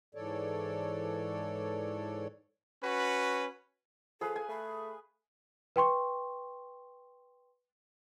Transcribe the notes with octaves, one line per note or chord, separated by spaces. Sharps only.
G#2 E3 A4 C#5 D5
C#4 F#4 B4
F3 G#4 A4 B4 F5
G#5
A3 B5
B4 G5 C6 C#6